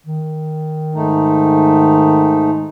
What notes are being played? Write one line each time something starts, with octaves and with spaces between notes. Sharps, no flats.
D#3
G#2 A3 D#4